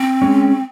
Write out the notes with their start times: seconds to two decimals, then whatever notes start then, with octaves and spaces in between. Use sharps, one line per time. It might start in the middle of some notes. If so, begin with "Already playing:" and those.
Already playing: C4
0.22 G#3 C#4